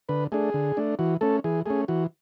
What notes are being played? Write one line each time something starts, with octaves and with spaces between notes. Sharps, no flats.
D3 B4
A3 D4 G#4
D3
A3 D4
E3 F#4
A3 C#4 A4
E3 G#4
A3 C#4 G#4
E3 F#4